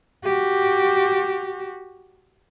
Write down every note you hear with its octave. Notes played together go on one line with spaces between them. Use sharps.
F#4 G4